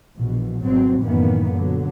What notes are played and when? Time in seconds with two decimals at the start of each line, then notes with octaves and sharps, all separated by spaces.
0.17 A#1 B2 E3
0.62 G#1 B2 F#3 C4
1.02 F#2 A2 D#3 E3 A#3 B3
1.53 A#2 D3 F#3